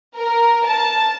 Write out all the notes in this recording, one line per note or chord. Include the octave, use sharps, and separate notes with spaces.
A#4
A5